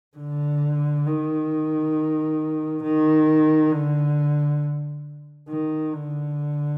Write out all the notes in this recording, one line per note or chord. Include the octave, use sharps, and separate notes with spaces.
D3
D#3
D#3
D3
D#3
D3